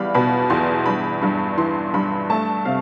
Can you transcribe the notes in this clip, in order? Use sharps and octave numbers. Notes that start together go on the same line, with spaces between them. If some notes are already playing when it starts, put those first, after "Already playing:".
Already playing: E2 G3 D5 F5 B5
B2 B5
E2 C6
G2 B5
G2 B5
E3 C6
G2 B5
A3 A5
C3 F5